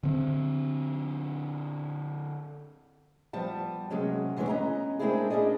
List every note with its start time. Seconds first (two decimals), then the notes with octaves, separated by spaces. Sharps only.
0.03 D3 C4
3.33 F3 G3 B3 A5
3.90 C3 F#3 G#3 A#3 C#4
4.37 D#2 E3 G#3 D4 B4 C#5
4.49 B3 C#4 D#5 A#5
4.99 G#3 A#3 C4 D4 E4 G#4
5.30 C#4 D4 G#4 D5 D#5